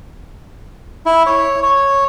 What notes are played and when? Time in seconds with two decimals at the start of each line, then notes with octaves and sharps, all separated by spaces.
1.06 E4
1.26 C#5
1.63 C#5